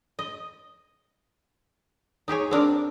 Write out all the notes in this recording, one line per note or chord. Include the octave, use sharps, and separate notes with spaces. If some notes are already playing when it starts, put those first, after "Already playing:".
D#5
D#4 G4 G#4 C#5
C4 D4 A#4